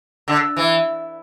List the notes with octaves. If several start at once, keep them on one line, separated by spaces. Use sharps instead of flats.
D3
E3